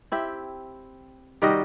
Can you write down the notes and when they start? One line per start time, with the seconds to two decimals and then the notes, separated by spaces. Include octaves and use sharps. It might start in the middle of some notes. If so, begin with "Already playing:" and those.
0.12 C4 E4 G4
1.42 D#3 G3 F#4 G4 D#5